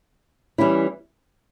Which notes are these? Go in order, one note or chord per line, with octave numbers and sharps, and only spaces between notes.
E3 G3 C#4 E4